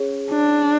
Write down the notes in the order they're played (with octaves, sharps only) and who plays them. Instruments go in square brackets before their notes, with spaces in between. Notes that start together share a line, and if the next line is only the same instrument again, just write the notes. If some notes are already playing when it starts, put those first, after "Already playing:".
Already playing: [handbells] C#4 G#4 C#5
[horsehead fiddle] D4